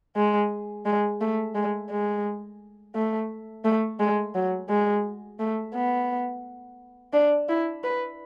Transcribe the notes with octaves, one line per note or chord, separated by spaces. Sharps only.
G#3
G#3
A3
G#3
G#3
A3
A3
G#3
F#3
G#3
A3
B3
D4
E4
B4